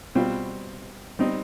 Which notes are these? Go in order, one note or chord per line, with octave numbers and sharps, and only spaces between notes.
B2 G3 C4 F4
G3 C4 D#4